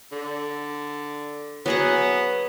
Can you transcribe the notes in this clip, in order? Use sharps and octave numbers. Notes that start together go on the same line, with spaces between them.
D3
F#3 B3 G#4 F#5